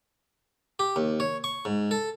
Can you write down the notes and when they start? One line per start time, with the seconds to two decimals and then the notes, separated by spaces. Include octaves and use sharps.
0.79 G4
0.96 D#2
1.20 C#5
1.44 C#6
1.65 G#2
1.91 A4